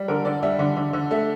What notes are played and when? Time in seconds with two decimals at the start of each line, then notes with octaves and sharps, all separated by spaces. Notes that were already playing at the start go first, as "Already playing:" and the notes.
Already playing: G3
0.08 D3 A#4
0.25 D3 D5
0.43 G3 E5
0.59 D3
0.77 D3
0.93 D3
1.11 A3 E5